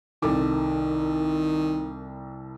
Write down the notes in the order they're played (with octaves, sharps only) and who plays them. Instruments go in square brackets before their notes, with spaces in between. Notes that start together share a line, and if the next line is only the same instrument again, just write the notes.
[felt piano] C2 A4 D6 [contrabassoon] D#3